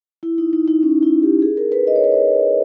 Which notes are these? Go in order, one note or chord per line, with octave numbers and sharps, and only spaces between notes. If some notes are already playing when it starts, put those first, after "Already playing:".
E4
D#4
D#4
D#4
C#4
E4
G4
G#4
A#4
B4
D#5
C#5
B4
C#5